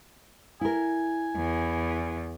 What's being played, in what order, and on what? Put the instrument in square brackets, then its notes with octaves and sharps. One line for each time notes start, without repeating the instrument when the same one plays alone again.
[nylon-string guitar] E4 A#4 [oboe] G#5
[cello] E2